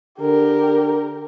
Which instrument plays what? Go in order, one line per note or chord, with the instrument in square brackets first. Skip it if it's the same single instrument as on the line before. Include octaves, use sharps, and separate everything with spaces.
[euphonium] D3 [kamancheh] G4 A#4